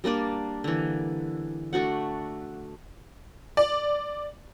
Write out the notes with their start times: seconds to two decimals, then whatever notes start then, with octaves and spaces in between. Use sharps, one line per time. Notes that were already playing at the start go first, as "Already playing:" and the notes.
0.04 G3 A#3 D4 D5
0.64 D3 E3
1.73 A3 D4 F#4 F#5
3.57 D5